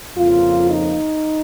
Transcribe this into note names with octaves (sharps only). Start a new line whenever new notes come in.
F2 C#3 F3 A#3 F4
D#4